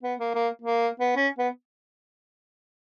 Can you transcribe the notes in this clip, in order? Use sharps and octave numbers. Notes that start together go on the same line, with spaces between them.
B3
A#3
A#3
A#3
B3
C#4
B3